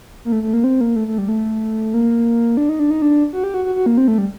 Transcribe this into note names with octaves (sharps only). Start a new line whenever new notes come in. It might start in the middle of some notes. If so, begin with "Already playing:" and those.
A#3
A3
A3
A#3
C4
A#3
A3
A3
G3
A3
A#3
D4
D#4
D4
D#4
D4
F#4
G4
F#4
F#4
F#4
A#3
C4
A3
G3